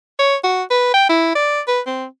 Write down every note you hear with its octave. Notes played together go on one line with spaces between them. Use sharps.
C#5
F#4
B4
G5
E4
D5
B4
C4